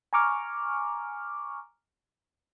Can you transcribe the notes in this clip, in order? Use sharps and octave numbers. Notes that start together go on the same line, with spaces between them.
G#5 A#5 C#6 D6 F6